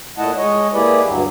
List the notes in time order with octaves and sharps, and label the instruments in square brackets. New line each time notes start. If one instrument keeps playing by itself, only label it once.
[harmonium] A#2 A3 E4 D#5 F#5 A5
G#3 C#5 D#5
A#3 E4 G4 G#4 B4 D5
D2 G2 F#3